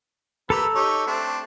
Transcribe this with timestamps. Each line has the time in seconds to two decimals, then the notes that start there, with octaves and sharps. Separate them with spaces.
0.50 A#3 G4 A4 B4 A#5 E6
0.75 D#4 G4 C#5
1.07 A3 C4 D4